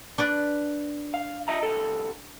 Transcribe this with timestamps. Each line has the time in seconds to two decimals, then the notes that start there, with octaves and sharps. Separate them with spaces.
0.18 D4 B4 D5
1.14 F5
1.48 D#5 E5 A#5
1.63 C2 A4